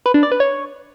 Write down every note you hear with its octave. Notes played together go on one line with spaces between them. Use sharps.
B4
D4
D5
B4
C#5